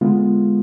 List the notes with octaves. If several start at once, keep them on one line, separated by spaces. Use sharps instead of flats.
D3 G#3 B3 F4